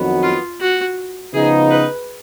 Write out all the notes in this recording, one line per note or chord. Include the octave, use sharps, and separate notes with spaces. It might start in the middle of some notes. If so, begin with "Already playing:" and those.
Already playing: F2 D#3 F#3 B3 F#4
F4
F#4
C#3 F3 B3 D#4 G#4
B4